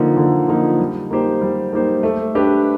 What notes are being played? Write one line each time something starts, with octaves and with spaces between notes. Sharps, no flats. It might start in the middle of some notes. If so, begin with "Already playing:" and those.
Already playing: D3 F3 A#3 D#4
D3
F3 A#3 D#4
G3
A#3 D#4 G4 C5
G3
A#3 D#4 G4 C5
A3
D4 G4 B4